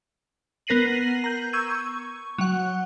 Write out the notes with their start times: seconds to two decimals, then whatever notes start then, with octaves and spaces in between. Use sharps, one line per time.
0.67 B3 A#4 A#6 C7 D#7 F#7
1.24 A#5 G6
1.53 C#6 E6 G6 G#6 D#7
1.70 C#6
2.38 F#3 F#5